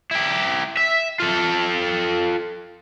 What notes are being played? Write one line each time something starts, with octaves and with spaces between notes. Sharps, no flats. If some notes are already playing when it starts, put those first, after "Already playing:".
E4 G4
E5
F4 A4